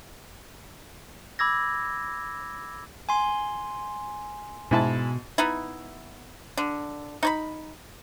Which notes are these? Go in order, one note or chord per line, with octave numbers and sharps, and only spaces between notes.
B5 D6 E6 G#6 A#6
G#5 C6
G#2 B2 E4 A5
B3 D#4 E4
D3
D#4 C#5 B5